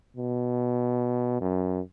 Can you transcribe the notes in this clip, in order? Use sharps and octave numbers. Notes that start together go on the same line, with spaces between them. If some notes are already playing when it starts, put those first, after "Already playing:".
B2
F#2